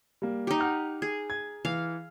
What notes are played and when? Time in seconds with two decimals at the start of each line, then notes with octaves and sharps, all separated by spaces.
0.22 G3 A#3
0.47 D#4 G4
0.60 F#5 F6
1.02 G#4
1.30 G#6
1.65 E3 F5